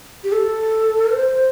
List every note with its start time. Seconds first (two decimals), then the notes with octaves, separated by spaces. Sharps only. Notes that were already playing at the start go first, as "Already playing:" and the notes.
0.24 G4
0.32 A4
1.13 C5